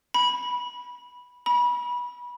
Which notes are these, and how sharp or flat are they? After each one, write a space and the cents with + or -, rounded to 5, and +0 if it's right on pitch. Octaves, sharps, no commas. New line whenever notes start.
B5 -10
B5 -25